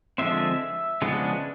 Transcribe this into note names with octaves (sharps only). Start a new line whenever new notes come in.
D3 F3 G#3 C4 E5
C#3 F3 G#3 B3 D4